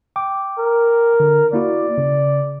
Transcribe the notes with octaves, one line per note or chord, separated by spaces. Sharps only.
G5 D6
A#4
D3
A#3 E4 F#4 D5
C#3